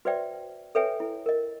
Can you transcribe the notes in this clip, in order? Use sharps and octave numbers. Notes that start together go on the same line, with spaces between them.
F#4 B4 C5 D5 E5 G5
A4 B4 C#5 E5 G5 G#5
E4
A#4 D#5